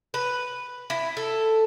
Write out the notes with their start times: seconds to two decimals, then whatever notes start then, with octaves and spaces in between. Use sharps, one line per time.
0.14 B4
0.90 E4
1.17 A4